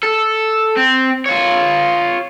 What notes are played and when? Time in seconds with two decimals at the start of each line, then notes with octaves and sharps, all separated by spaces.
0.03 A4
0.77 C4
1.26 F4 C#5